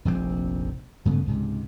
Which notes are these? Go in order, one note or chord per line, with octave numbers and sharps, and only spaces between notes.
F1 A#1 A#2 C4
G2 C#3 A3 B3
C#2 G#2 C3